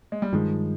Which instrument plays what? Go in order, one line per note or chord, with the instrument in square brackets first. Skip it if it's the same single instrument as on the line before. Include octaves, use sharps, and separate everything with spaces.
[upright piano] G#3
G3
[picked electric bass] G2 D#3 G#3 [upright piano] F3